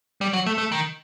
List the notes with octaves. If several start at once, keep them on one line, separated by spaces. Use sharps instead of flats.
G3
F#3
A3
A3
D#3